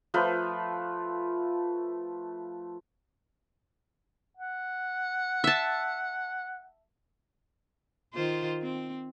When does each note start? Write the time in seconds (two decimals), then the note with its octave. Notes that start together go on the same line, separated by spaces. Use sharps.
0.14 F3 A3 F4 B4
4.37 F#5
5.44 E5 A5
8.14 D#3 F4 C5
8.62 C4